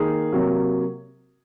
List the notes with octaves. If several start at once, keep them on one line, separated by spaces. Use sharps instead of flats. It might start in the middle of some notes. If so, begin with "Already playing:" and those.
Already playing: D#3 A#3 D#4 G#4
C3 F#3 A#3